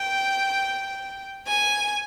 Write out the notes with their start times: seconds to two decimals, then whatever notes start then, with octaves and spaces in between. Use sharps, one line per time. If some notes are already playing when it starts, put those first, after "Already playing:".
Already playing: G5
1.47 G#5